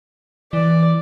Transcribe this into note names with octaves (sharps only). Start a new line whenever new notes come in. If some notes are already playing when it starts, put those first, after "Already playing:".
E3 D5